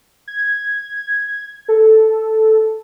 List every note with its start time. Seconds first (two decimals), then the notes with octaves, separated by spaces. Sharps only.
0.28 G#6
1.68 A4